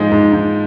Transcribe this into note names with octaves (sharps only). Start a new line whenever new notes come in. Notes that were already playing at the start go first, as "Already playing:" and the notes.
Already playing: G#2 F3 G#3
G#2
G#2